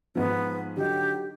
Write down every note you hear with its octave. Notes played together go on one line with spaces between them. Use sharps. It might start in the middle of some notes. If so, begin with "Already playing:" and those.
G#2 F3 B3
D3 F#3 D#4 G4